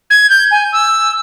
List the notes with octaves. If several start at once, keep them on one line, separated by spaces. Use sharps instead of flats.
G#6
G6
G#5
E6